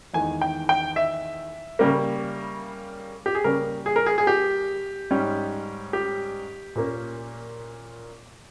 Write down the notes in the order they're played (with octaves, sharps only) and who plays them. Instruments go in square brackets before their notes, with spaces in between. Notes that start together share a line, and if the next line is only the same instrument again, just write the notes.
[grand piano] E2 D#3 G#3 G#5
G5
G5
E5
C#3 G3 A#3
G4
G#4
C#3 G3 A#3 C#4 A#4
G#4
A#4
G#4
G#4
G4
G#2 G3 C#4
G4
A#2 A#3 C#4